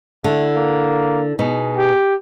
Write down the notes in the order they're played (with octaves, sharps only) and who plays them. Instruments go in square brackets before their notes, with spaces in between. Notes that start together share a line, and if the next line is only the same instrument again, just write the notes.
[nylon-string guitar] D3 E4 [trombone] A3
[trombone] A#3
[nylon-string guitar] B2 D#4 [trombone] G#4
[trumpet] G4